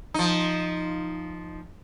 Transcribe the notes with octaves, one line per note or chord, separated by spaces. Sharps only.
F3 D#4